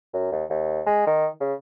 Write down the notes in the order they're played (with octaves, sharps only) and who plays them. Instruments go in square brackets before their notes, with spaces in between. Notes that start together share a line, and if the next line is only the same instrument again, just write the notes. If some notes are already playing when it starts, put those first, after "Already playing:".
[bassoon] F#2
D#2
D#2
G#3
D#3
C#3